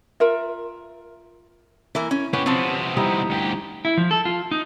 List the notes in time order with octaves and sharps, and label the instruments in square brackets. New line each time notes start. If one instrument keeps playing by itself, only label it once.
[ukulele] F4 A#4 E5
[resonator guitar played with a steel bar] E3 A#3 A#4 [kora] E4
[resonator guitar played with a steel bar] C#4
[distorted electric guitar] B3 G4 [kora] C#4 [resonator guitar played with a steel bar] B4
[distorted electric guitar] C3 B3 [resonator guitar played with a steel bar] F3 C4
[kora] G3 D#4 E4
[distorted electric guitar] D2 G4
[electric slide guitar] E4
F3
A4
F4
D#4